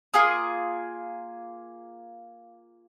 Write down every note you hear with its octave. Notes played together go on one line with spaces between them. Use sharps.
A#3 F4 G#4 D#6